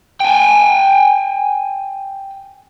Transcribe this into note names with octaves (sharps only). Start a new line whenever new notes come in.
G5 G#5